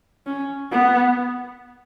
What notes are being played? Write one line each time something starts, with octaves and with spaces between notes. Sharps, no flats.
C#4
B3